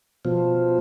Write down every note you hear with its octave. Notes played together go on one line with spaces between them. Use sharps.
B2 F3